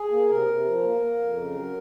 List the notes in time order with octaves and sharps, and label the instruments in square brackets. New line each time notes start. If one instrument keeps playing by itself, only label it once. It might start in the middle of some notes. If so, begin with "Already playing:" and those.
Already playing: [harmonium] G#4
A#3
C3 A#4
C3
F3
A#3
A#3
F2
C#3
F#3